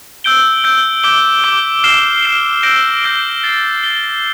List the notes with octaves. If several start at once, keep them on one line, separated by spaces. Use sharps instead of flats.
E6 G6 D7 G7
E6 G6 D7 G7
D6 G6 D7 G7
D6 G6 D7 G7
F6 C7 E7 G7
F6 C7 E7 G7
E6 G6 A#6 D7 G7
E6 G6 A#6 D7 G7
A6 C7 G7
A6 C7 G7